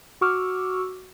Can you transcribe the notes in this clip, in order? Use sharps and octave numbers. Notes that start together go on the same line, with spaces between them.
F#4 C#6 D6 E6 F6